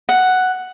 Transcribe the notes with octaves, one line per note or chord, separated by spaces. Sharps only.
F#5